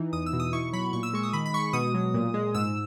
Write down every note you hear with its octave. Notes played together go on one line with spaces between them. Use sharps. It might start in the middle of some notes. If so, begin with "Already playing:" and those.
Already playing: E3 D#4
E2 D#6
E6
B2
D#6
E4 C#6
F#3 B5
A#2 C#6
E6
G#3 C#6
D#6
D#3 B5
B5
G#3 C#6
B2 D#6
F#3
A#2
G#3
G#2 E6